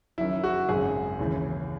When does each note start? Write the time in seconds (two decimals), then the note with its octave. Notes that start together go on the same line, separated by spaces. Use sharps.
0.18 F#1 F#2 D#3 E4
0.44 F#4
0.69 G#1 F#2 C#3 G#4
1.19 D#2 C#3 E3